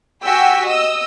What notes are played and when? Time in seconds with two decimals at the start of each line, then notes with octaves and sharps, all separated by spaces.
0.24 F#4 G4 G5 G#5 E6 B6
0.66 D#5 D#6 E6